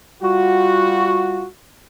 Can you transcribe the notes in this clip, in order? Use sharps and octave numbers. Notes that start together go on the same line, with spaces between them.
G3 F4 F#4